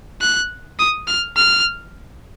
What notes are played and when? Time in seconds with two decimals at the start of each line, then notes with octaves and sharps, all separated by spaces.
0.21 F#6
0.79 D#6
1.08 F6
1.36 F6